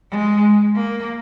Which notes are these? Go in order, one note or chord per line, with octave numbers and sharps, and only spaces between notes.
G#3
A#3